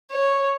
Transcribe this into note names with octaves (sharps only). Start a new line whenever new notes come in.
C#5